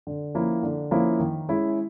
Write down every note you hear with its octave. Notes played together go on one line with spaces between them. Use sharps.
D3
F3 A#3 C#4 E4
D3
F3 A#3 C#4 E4
D#3
G#3 C#4 E4